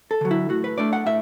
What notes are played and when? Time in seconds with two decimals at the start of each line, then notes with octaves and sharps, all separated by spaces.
0.11 A4
0.21 D3 F#3
0.31 E4
0.49 A2 F#4
0.64 B4
0.78 A3 D4 D5
0.93 F#5
1.06 A2 E5